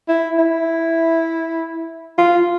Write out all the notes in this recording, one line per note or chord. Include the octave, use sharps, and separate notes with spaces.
E4
E4
F4